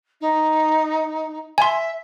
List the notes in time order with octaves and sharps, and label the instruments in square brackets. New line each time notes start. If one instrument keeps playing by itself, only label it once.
[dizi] D#4
[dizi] E5 [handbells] G#5 C6